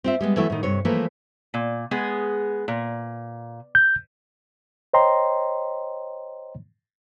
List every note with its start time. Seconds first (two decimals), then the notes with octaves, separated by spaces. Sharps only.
0.04 C4 F4 E5
0.21 G3 G#3 B3
0.36 E3 F#3 A3 B3 E4
0.50 A2 D#3
0.63 G2 C3 C#5
0.85 E3 F3 A3 A#3 A#4 B4
1.54 A#2
1.91 G#3 B3 G#4
2.68 A#2
3.75 G6
4.94 C5 C#5 D#5 G5 A#5 C6